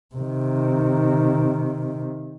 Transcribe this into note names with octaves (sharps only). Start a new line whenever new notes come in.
C3 D#3